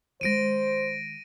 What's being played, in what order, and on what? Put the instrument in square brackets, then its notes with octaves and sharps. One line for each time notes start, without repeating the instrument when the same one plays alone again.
[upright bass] D#3 G#3 [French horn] C5 [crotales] A#6 D7 D#7